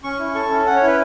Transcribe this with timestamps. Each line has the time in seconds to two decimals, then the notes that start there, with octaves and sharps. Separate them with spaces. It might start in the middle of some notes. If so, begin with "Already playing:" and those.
0.04 C#4 C#6
0.19 E4
0.35 A4 C#6
0.51 C#4
0.66 C#4 F#5
0.76 C#5
0.82 E4
0.87 B4